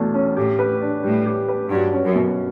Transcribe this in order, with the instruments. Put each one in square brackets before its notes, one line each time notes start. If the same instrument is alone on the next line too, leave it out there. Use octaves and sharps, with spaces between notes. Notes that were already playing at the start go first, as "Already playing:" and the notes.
Already playing: [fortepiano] E2 B2 A3
C#4
[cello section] A2 [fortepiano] G4
[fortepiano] B4
D4
[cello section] A2 [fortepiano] G3
[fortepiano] G4
B4
[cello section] G2 [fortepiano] F#3
[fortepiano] C#4
[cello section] F#2
[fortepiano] B2